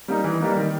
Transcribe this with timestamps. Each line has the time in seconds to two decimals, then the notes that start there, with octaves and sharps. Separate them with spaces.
0.08 G3 A#3 D#4
0.24 E3
0.40 G3 A#3 D#4
0.57 D#3